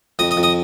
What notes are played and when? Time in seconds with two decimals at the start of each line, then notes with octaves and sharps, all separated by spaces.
0.19 F2 D#5 D#6
0.31 D#5 D#6
0.37 F2
0.43 D#5 D#6